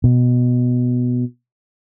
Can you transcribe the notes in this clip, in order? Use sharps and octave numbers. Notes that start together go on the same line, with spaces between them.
B2